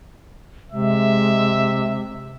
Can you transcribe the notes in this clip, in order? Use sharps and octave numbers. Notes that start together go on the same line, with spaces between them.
C3 G#3 E5